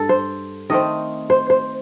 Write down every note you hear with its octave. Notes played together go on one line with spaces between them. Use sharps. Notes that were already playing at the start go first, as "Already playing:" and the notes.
Already playing: G2 A4
C5
D#3 A3 C4 D#5
C5
C5